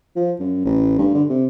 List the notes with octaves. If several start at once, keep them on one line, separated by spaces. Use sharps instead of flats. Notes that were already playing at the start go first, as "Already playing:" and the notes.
F3
F#2
A1
G2
D3
C3